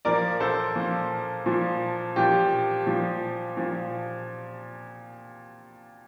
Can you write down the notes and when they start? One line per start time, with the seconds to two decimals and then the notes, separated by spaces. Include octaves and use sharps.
0.05 A#2 F3 A#4 D5
0.40 A4 C5
0.76 A#2 F3
1.46 A#2 F3
2.16 A#2 F3 G4
2.87 A#2 F3
3.57 A#2 F3